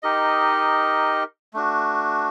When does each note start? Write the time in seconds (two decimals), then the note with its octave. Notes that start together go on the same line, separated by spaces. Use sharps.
0.03 D#4 G4 A#4 D#5
1.54 A3 D4 F#4